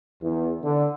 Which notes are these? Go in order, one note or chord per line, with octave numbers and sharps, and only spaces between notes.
E2
D3